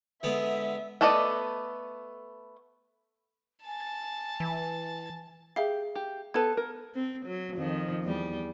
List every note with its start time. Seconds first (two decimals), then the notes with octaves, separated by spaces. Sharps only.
0.23 D3 G#3 B3 E5
1.01 A3 B3 A4 D5 D#5
3.65 G#5 A5 A6
4.40 E3
5.56 G4 G#4 E5 F5
5.95 G4
6.34 B3 A4 B4 A5 G#6
6.57 A#4
6.95 C4
7.26 F#3
7.55 F2 D#3 F3
8.04 E2 G3